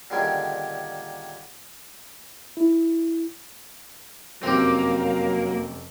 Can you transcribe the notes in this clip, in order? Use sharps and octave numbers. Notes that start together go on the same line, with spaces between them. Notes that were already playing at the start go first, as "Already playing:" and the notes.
A#2 D3 D#3 G3 C#4 G#4
E4
F1 F#2 F#3 A#3 C4 G4